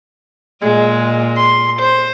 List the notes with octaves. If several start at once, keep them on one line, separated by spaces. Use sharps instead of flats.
A#2 G#3
C6
C5